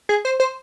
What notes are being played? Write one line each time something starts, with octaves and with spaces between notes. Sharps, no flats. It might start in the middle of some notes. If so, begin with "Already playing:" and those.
G#4
C5
C5